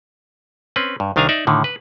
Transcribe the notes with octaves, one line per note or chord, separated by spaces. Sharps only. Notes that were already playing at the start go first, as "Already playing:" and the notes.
C4 C#4 B4
G2
C2 D#3 D4 F5 G#5 A#5
D#4 D5 E5
A2 D3 D#3
B4